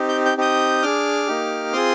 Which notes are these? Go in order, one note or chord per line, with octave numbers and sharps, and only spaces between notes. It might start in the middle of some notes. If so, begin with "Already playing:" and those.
Already playing: C4 D#4 G4
G6
G6
C4 D#4 G4 D#6 G6
D4 G#4 D6 F6
A#3 D#4 G4
C4 F4 G#4 C6 D#6